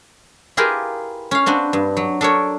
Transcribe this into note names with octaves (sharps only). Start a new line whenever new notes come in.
E4 F4 G4 G#4 A#4 B4
C#4 F5
C4 D4 F#4 B4
G2
F#3
D4 A4 A#4 C#5